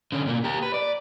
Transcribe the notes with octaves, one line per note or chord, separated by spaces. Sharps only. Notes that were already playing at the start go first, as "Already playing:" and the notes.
D3 C#4
B2 A#3
G4 A#4
B4
D5